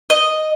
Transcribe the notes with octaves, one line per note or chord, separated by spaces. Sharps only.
D#5